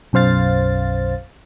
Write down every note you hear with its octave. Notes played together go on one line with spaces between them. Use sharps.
B1 F#2 C5 F5 A6